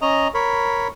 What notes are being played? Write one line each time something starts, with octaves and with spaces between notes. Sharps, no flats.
C#4 D#5 A#5
A#4 C#5 B5